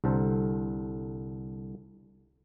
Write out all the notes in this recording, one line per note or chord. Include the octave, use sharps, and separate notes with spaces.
C2 D3 A4 C5